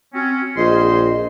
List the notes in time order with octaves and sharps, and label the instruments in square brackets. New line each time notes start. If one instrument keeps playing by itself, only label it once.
[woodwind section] C4 C#4 [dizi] F#4
[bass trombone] A#1 [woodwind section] G#4 C5 C6 [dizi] D#5